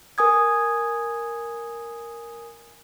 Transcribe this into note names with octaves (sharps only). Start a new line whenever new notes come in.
A#4 G#5 D#6 G#6